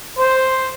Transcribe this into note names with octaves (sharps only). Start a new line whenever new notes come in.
C5